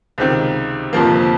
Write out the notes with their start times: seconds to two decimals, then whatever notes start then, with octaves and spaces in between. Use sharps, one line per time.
0.18 C#2 C3 D#3
0.93 G1 F2 C3 F3 A#3